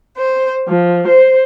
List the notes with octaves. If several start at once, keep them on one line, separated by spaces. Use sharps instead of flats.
C5
F3
C5